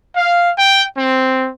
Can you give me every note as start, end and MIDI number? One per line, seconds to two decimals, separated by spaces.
0.16 0.51 77
0.57 0.84 79
0.96 1.49 60